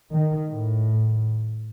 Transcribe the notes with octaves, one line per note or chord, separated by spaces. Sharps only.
D#3
A2